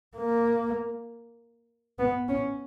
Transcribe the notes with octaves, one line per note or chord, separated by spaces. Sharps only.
A#3
B3
C#4